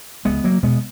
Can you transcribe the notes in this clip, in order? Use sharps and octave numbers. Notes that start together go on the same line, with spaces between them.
C#2 G#3 B3
F#3 A#3
B2 G#3 B3